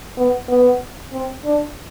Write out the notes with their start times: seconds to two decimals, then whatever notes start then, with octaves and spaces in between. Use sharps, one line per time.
0.18 B3
0.49 B3
1.12 C4
1.44 D4